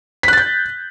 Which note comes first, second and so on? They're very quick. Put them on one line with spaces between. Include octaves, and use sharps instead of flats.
B6 F#6 A6 G6